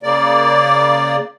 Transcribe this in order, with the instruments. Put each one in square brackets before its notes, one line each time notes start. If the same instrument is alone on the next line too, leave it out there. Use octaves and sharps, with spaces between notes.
[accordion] C#3 A#3 D5